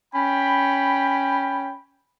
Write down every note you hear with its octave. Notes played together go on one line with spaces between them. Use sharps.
C#4 G5 B5